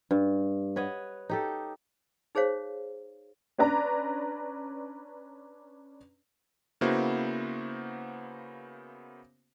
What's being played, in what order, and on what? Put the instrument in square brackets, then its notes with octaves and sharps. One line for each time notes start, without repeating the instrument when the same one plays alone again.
[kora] G2
B4 C#5 D#5 F#5
D#4 G4 A4
[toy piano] D#4 G#4 C5 C#5 F5
[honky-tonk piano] C#4 D4 B4 D5 A#5
[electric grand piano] C#3 A#3 B3 E4 F#4 C5